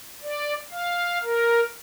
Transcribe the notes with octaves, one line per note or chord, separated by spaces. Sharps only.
D5
F5
A#4